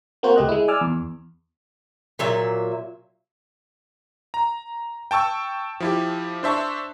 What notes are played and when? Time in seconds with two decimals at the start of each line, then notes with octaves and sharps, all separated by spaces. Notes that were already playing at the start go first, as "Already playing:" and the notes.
0.23 A#3 C4 F#4 C5
0.36 C#2 A3 G4 D#5 F#6
0.49 G#3 E4
0.68 D5 G#5 D6 E6 F6
0.81 E2
2.19 A#2 F#3 E5
4.34 A#5
5.11 G5 A5 C#6 E6
5.80 F3 E4 G4
6.43 D4 C5 E5 A5 C#6